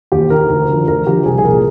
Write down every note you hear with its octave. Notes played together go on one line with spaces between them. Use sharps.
D#2 G4
D#3 A#4
D2
D3 F3
D2 A#4
D3 F3 G4
C2 G#4
G#4
A#2 F3 A#4